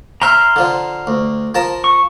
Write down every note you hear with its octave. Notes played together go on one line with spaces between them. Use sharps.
C5 E5 A#5 C6 F6
D3 F3
D2
F3 A#4 A5
C#6